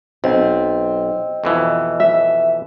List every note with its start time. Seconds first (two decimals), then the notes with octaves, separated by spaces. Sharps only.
0.24 B1 C4 D#5
1.44 F2 B2 E3
2.00 E5